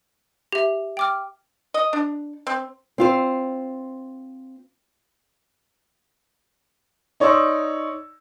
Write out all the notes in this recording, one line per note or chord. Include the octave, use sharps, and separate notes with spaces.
G4 E5
G5 D6 F6
D#5
D4
C4
C4 F4 C5
D#4 C#5 D5 C6 E6